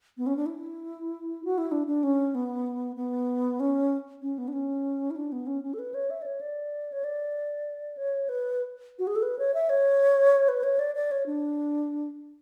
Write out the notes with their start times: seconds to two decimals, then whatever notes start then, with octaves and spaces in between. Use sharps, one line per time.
0.18 B3
0.27 C#4
0.37 D4
0.46 E4
1.44 F#4
1.58 E4
1.72 D4
1.87 D4
2.03 C#4
2.35 B3
2.96 B3
3.60 C#4
4.22 C#4
4.38 B3
4.48 D4
4.53 C#4
5.11 E4
5.16 D4
5.32 B3
5.47 C#4
5.64 C#4
5.74 A4
5.79 B4
5.94 C#5
6.10 E5
6.22 D5
6.26 C#5
6.41 D5
6.92 C#5
7.04 D5
7.97 C#5
8.29 B4
8.99 F#4
9.07 G#4
9.16 A4
9.22 B4
9.39 C#5
9.54 E5
9.69 C#5
10.48 B4
10.64 C#5
10.79 D5
10.95 D5
11.11 C#5
11.26 D4